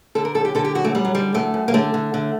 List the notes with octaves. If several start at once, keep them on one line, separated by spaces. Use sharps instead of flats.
D3 A4
A#4
F#2 A4
G4
D3 A4
G4
F#2 F#4
A3
F#2 G3
F#3
D3 G3
F#2 A3
F#2
A#3
D3 A3
D3
D3